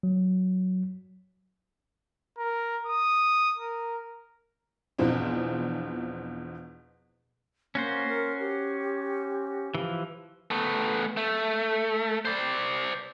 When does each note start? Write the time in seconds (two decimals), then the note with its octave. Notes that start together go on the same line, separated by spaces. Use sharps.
0.03 F#3
2.37 A#4
2.86 D#6
3.58 A#4
4.98 E2 B2 E3 F3 C4 D4
7.75 A#3 C#4 F#4 C5
8.09 A#4
8.40 G4
9.75 E3 F3
10.51 A3 B3
11.17 A3
12.25 C5 D5